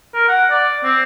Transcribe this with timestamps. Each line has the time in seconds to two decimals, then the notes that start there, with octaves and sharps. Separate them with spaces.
0.14 A#4
0.28 F#5
0.51 D5
0.84 C4